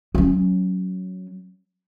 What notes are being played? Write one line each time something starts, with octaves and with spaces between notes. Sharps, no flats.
F#3 C#4